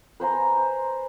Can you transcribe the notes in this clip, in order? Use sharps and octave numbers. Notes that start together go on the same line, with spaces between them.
B4 C5 G#5 A#5